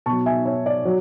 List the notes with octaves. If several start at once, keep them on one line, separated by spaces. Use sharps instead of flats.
B2 F#3 A5 C#6
E5 G#5
C#5 E5
D5
F#3